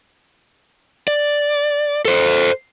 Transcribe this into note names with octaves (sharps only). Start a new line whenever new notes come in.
D5
A4 C5